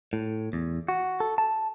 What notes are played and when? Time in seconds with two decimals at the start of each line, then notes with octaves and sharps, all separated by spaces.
0.13 A2
0.53 E2
0.88 F#4
1.20 A4
1.38 A5